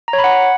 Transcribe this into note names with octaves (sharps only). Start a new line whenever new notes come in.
A#5
C#5
B5
F#5